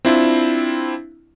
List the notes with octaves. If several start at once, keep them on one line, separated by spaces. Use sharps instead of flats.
C4 D4 E4 F4